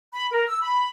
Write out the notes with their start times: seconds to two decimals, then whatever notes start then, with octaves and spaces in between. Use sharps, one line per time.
0.13 B5
0.31 A#4
0.48 E6
0.62 B5